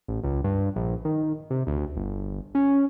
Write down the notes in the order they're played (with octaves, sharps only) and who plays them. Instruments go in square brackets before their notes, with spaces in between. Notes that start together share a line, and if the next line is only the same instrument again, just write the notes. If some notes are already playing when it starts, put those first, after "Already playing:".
[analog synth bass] A1
C#2
G2
A#1
D#3
C3
D2
G1
C#4